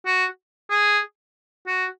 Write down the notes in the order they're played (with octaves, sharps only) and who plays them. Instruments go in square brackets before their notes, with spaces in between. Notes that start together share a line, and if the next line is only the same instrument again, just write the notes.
[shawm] F#4
G#4
F#4